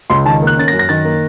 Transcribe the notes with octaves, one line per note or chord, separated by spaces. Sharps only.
C#2 C6
D#3 A5
A#3
F#6
C#4 A6
A#6
F#2
A#6
D#3 A6
A#3